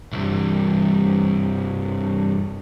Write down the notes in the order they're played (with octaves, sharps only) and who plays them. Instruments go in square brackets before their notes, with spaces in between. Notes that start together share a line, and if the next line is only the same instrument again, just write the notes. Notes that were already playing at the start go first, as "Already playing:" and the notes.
[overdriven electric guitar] C2 G2